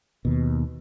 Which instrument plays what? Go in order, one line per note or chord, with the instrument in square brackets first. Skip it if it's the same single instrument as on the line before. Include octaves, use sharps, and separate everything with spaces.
[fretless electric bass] D#2 B2